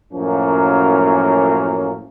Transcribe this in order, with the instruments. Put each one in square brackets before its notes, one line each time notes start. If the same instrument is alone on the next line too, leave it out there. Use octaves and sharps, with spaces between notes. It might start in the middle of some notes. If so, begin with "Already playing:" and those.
[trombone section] F#2 A2 F3 F#3 A#3 C#4